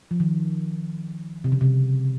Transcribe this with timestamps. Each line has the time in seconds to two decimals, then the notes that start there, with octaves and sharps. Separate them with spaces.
0.11 F3
0.20 D#3
1.44 C3
1.52 C#3
1.61 C3